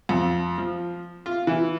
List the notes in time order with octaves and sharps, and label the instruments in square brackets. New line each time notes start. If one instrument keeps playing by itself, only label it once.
[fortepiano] F2
F3
F4
E3